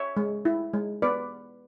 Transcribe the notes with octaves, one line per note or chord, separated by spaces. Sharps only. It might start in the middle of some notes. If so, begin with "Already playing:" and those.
Already playing: C#5 E5
G#3
E4
G#3
B3 B4 D5